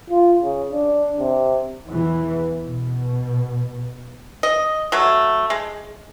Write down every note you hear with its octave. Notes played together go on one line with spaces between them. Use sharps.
F4
C#3
D4
C3
E2 E3
B2
D#5
F#3 A3
G#3